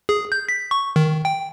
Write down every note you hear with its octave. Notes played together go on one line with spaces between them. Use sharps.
G#4
G6
B6
C#6
D#3
G5